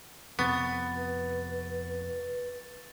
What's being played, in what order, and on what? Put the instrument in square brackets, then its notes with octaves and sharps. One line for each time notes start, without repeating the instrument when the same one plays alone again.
[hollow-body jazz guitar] F2 C3 [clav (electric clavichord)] B3 [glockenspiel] C#6 A6
[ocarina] B4